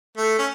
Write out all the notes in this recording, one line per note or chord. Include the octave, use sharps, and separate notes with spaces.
A3
C#4